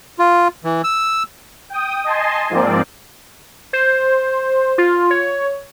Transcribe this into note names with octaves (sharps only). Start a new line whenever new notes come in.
F4
E3
E6
G5 D#6
D#5 G#5 A5 C6
G#2 F3 A#3 C4 D5
C5
F4
C#5